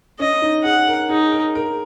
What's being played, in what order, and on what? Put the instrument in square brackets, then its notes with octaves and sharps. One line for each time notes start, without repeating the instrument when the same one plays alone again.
[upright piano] C#4 [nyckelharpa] D#5
[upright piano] D#4
[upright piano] G#4 [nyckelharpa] F#5
[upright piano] A#4
[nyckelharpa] D#4 [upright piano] G#4
[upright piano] A#4
A#4